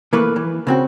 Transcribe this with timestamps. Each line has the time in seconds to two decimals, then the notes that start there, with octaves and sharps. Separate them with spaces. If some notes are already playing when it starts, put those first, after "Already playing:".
0.13 E3 A3 A#3 B4
0.36 E3
0.67 C#3 C4 F#4